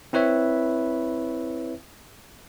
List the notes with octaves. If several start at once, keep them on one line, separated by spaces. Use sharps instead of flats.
C4 E4 B4 C#5 E5